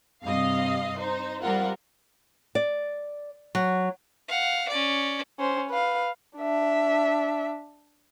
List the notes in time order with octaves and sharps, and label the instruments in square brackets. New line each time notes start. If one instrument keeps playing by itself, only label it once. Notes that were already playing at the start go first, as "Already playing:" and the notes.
[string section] G2 C3 D#5 F5 C7
D#4 C5
G3 C4 F4 A#4 F5 F#5
[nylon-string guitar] D5
F#3
[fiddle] F5 F#5
C#4 D5
[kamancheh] C#4 C5
B4 F5
D4 E5